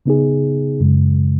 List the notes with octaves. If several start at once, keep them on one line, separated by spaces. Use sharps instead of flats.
C#3 B3 D#4 G#4
F#2 C#3 G#3